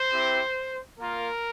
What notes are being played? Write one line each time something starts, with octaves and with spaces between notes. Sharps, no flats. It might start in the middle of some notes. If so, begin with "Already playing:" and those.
Already playing: C5
C4 E4 G4
A#3 F4 A#4